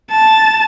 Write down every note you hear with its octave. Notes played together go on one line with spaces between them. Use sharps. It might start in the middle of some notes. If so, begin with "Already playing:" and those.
A5